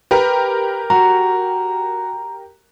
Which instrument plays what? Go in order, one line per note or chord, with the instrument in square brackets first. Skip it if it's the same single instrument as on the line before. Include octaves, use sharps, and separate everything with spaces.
[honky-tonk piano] G4 A#4 [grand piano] B4
[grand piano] F#4 [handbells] A#5